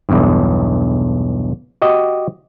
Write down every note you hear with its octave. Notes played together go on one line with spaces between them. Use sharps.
B1 E2 G2
F#4 G4 D#5